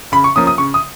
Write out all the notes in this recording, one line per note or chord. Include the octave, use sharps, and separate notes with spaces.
C#3 B5
C#6
F3 A#3 C#4 D#6
D#6
C#3 C#6
D#6